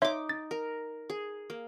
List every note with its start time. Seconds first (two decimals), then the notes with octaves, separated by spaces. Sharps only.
0.02 D#4 C#5 E5 C6 D6
0.29 A6
0.51 A#4
1.10 G#4
1.50 A#3